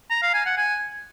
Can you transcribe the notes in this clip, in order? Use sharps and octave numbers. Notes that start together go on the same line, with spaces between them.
A#5
F5
G#5
F#5
G#5